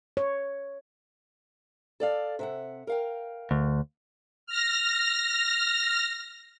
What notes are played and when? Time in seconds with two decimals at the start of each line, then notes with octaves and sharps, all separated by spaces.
0.17 C#5
2.00 A4 D5 F5
2.39 C3 E5 F#5
2.87 A#4 F5 G5
3.51 D2
4.47 F6 A#6